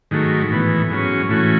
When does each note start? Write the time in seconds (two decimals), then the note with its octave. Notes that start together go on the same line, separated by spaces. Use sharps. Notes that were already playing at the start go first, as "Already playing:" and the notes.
0.11 G#2 D#3 F#3 A3
0.50 A2 E3 B3
0.90 G#2 F#3 C#4
1.29 A2 E3 A3 C#4 F#4